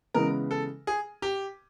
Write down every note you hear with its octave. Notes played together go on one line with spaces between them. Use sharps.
C#3 E3 G#3 B3 A#4
A4
G#4
G4